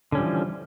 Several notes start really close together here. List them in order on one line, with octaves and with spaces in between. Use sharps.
D3 C#4 G3 F3 E3